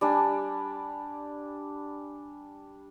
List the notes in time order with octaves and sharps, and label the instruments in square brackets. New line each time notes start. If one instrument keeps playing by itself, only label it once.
[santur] G3 D4 G#5